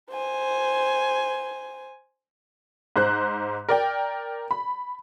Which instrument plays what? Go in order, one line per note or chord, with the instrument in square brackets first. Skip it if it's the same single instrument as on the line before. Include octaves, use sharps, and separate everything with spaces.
[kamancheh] C5 G#5
[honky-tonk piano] G#2 C5 F#6
A#4 D5 G5
B5